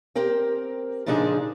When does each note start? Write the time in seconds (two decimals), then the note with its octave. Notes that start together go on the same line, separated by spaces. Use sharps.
0.15 C4 G4 A#4 G5
1.06 A#2 C#3 F3 D4 D#4 G#4